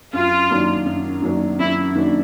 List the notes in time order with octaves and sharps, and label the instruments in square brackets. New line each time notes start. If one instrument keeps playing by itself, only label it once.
[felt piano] F#2 [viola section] F4
[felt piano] D#3 F#3 A#3 D4
F#2
D#3 F#3 A#3 D4
[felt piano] F#2 [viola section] E4
[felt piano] D#3 F#3 A#3 D4